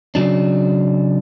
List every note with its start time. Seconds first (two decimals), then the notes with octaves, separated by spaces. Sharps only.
0.15 C#3 F#3 D4